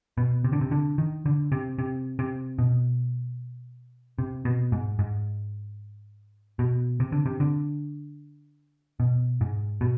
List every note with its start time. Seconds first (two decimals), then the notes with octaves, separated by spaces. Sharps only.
0.18 B2
0.44 C3
0.52 D3
0.61 C3
0.71 D3
0.98 D#3
1.26 D3
1.52 C3
1.78 C3
2.19 C3
2.59 B2
4.19 C3
4.45 B2
4.72 G#2
4.99 G#2
6.59 B2
7.00 C3
7.12 D3
7.26 C3
7.40 D3
9.00 B2
9.41 G#2
9.81 B2